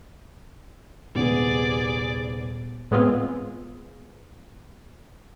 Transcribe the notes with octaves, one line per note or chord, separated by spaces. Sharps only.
D#1 C3 B3 G#4 D5
A2 G#3 B3 C4 F4 G#4